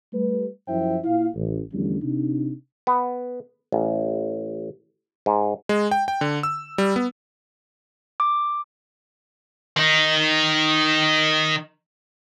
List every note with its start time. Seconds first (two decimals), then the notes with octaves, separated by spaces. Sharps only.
0.12 G3 A3 B4
0.67 F#2 F3 E4 C5 E5 G5
1.04 A#2 E4 F5
1.34 A1
1.72 E2 D3 F3 G3 A3 C#4
2.03 C3 D4 D#4
2.87 B3
3.72 A1
5.26 G#2
5.69 G#3
5.91 G5
6.08 G5
6.21 D3
6.43 E6
6.78 G3
6.96 B3
8.20 D6
9.77 D#3 D#4